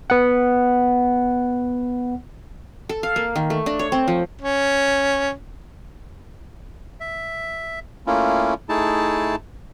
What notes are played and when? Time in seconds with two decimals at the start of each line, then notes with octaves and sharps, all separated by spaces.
0.10 B3 F#5
2.89 A4
3.03 F5
3.16 A#3
3.36 D#3
3.50 A3
3.66 D4
3.79 C#5
3.92 C4
4.08 F3
4.42 C#4
7.00 E5
8.07 A3 A#3 C#4 E4 F4
8.69 A3 D#4 E4 G#4 A5